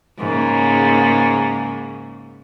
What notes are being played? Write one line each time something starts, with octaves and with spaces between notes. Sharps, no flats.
G#2 C#3 A#3